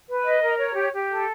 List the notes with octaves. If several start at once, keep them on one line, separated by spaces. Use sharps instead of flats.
B4
D#5
A#4
C#5
G4
G4
A4